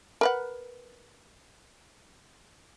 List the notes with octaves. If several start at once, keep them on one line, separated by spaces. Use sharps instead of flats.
A#4 B4 F#5